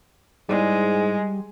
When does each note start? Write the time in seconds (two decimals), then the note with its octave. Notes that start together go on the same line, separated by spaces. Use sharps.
0.49 G#2 G3 G#3 E4 B4 D5